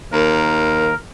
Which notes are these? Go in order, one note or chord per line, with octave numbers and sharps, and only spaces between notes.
D#2 A#4